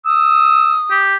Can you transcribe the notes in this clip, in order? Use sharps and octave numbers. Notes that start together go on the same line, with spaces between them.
D#6 E6
G4